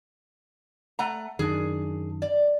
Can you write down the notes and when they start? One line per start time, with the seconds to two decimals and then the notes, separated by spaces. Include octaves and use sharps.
0.99 A3 F#5 A#5
1.39 F#2 D#3 D4 G#4
2.22 D5